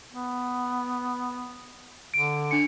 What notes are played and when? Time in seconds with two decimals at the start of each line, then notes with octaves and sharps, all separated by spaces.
0.12 B3
2.14 D3 D7
2.51 D4 C#7